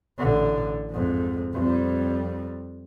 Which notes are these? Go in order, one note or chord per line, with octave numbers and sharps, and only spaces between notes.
A1 D3
F2 G#2
F2 G3